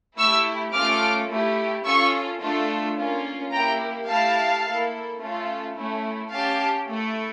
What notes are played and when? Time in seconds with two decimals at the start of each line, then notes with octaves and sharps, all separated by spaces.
0.18 A3 E4 G4 C#6 E6
0.73 A3 C#4 F4 A4 D6 F6
1.29 A3 E4 G4
1.85 C#4 F4 A4 C#6 E6
2.41 A3 D4 F4 A4
2.97 A#3 C#4 F4
3.52 A#3 E4 G4 G5 A#5
4.08 A3 E4 G4 F5 A5
4.64 A#3 E4 A4
5.20 A3 C#4 F4 A4
5.76 A3 C#4 E4
6.32 C#4 G4 F5 A5
6.87 A3 E4 A4